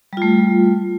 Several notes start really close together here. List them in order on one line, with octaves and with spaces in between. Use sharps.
G3 F4 A3